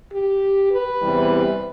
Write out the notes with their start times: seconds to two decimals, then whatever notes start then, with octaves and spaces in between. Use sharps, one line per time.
0.11 G4
0.71 B4
1.02 E2 C3 E3 G3